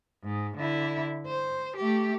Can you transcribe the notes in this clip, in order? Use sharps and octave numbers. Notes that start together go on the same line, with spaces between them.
G#2
D3 E4
C5
A3 G4